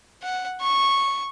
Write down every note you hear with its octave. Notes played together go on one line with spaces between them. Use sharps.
F#5
C#6